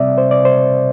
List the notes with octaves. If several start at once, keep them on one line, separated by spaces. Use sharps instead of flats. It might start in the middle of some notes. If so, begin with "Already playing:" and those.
Already playing: C3 G3 C4 D5 E5
C5
D5
C5